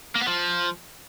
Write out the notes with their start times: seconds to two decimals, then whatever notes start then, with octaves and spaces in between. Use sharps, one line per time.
0.15 A#3
0.21 B3
0.27 F3